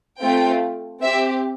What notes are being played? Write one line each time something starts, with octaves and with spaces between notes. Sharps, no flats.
A3 C4 F4 G5
C4 E5
G4